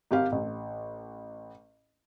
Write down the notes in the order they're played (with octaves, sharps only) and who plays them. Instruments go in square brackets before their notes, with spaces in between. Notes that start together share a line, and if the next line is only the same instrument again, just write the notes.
[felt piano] G#1 G4 F5
A1